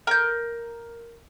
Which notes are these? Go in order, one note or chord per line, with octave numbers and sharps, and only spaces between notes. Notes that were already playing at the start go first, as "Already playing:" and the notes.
A#4 G6